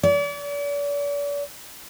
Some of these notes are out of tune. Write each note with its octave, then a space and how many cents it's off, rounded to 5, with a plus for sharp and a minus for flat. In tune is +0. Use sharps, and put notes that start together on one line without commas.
D5 -40